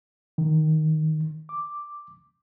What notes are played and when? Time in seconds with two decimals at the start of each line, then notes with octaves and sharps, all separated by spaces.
0.38 D#3
1.49 D6